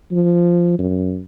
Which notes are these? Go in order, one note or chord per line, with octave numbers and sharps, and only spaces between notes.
F3
F#2